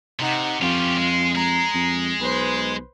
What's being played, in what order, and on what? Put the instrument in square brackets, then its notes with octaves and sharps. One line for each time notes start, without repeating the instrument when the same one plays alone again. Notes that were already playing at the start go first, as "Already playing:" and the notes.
[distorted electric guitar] C3 [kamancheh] D#4 F#5
[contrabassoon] F2 [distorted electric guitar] C#4 G4 [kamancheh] F4
[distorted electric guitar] G#3
[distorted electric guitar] G#3 [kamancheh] A#5
[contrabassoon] F2
[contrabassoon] B1 [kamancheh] B4 C5